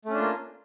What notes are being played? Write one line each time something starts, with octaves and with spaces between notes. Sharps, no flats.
A3 A#3 C#4 D4 F4